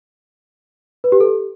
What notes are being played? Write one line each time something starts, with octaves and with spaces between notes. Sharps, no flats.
B4
G4
A4